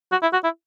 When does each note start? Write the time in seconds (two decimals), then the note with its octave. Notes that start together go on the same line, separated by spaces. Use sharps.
0.11 F#4
0.22 E4
0.33 F#4
0.44 E4